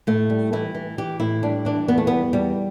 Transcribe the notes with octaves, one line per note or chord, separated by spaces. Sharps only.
A2 A3
G3
E3 E4
E3
E3 G4
A2 E4
G3 D4
E3 D4
E2 B3
A3
G3 B3
E2 G3